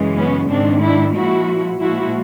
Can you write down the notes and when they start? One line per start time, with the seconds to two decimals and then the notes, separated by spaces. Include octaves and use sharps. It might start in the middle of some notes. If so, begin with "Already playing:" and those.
Already playing: F#2 C#3 E3 G#3
0.16 B3 C#4
0.49 G#2 D#3 G#3 C4 D4
0.82 D4 E4
1.15 A#2 F3 G#3 E4 F#4
1.81 A#2 F3 G#3 E4 F#4